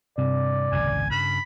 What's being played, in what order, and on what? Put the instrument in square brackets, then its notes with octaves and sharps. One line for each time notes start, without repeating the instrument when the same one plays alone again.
[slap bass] G2 [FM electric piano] C3 [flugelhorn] D5
[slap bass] G#1 C#2 F#2 [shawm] G#5
[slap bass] G2 C#3 [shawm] B5